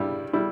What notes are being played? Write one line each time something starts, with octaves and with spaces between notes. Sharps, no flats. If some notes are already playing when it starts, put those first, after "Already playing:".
Already playing: G2 G3 E4
G3 E4